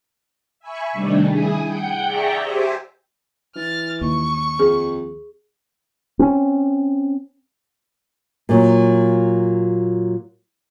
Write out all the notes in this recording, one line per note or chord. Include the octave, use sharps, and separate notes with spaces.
E5 G#5 B5 C#6
C3 D#3 G3 A3 D4
E4 G#4 G#5 D#6
F#5 G5 G6
G#4 D5 E5 G5 A#5 C#6
G4 C5 E5 G#5
E3 F6 A6
D#2 C#6
F2 G#4
C4 C#4
A#2 F#3